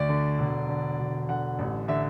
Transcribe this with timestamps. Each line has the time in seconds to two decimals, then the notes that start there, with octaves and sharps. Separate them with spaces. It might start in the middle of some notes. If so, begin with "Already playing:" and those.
Already playing: D2 D5
0.09 D3
0.39 E1
0.68 D3
0.99 E1
1.29 D3 F#5
1.59 A1
1.88 D3 E5